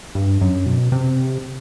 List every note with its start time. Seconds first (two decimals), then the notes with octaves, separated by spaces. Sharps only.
0.15 G2
0.41 F#2
0.66 B2
0.92 C3